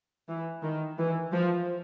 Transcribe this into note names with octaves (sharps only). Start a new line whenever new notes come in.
E3
D#3
E3
F3